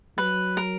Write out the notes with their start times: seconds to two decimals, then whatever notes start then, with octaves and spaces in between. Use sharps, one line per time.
0.18 F#3 B4
0.57 A#4